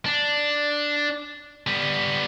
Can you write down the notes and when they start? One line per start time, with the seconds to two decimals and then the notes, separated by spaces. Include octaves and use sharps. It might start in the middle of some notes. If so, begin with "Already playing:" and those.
0.06 D4
1.67 G3 B3